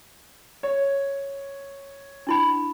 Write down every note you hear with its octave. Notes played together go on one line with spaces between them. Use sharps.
C#5
D4 E4 B5